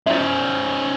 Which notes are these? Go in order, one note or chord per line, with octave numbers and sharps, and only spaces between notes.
C#4 E4 C5 E5